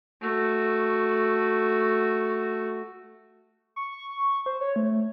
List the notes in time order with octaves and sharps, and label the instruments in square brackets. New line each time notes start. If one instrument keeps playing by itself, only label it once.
[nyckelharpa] A3 F#4
[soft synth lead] C#6
C5
C#5
A3